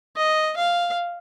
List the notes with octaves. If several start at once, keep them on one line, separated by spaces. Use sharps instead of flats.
D#5
F5